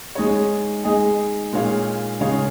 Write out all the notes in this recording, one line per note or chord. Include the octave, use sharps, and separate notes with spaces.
G#3 D#4 C#5
G#3 D#4 G#4 D#5
A#2 G#3 D#4 C#5 F5
C#3 G#3 D#4 C#5 F5